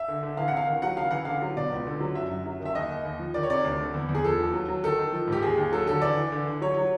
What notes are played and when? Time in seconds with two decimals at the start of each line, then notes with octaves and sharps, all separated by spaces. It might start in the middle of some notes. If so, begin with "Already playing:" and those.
Already playing: E5
0.08 D3
0.23 D3
0.37 E3 F5
0.48 F#5
0.52 C3 F5
0.67 D#3
0.82 F#3 F#5
0.97 C#3 F5
1.11 E3 F#5
1.25 D3 F5
1.42 F#3
1.56 B2 D5
1.72 C#2
1.87 D3
2.01 F#3
2.15 F#2 E5
2.31 F#2
2.46 F#3
2.60 D#3
2.65 E5
2.75 D#2 D#5
2.90 D#2
3.05 D#2
3.19 F3
3.34 D#3 D5
3.43 C#5
3.50 C3 D5
3.64 D2
3.80 D3
3.94 E2
4.09 E2
4.15 G#4
4.24 F3 A4
4.39 D#2
4.53 F#3
4.69 F#3
4.84 D#3 A4
4.99 D#3
5.12 F3
5.27 G#2 G4
5.42 D#2 G#4
5.58 D#2
5.72 F#3 A4
5.87 D3 A4
6.02 E3 D5
6.17 E3
6.32 D3
6.46 D3
6.61 F#3 C#5
6.77 F#3